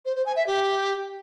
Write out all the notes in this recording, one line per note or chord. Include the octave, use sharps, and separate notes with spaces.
C5
C5
G#5
E5
G4